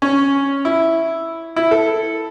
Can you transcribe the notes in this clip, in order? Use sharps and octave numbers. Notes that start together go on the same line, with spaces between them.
C#4
E4
E4
A4